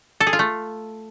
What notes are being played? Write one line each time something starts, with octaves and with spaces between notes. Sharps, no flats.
A4
G#4
F4
A3